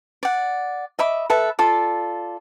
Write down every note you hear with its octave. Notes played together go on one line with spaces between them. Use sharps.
D5 F#5
D#5 E5 B5 D6
A4 B4 E5 A5
F4 A4 D5